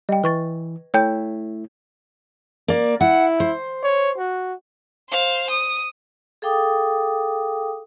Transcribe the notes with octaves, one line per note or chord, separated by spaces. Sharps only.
G3 D#5 G5
E3 B4 C#6 A6
A3 E4 C#5 G5 G6
A#3 D5
E4 F#5
C5
C#5
F#4
C5 F5
D#6
G#4 A4 F5 G5 D6 D#6